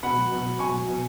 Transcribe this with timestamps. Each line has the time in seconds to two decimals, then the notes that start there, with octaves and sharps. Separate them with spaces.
0.03 B2 F#5 B5
0.17 F#3
0.32 B2
0.45 F#3
0.59 B2 G#5 C#6
0.73 F#3
0.88 B2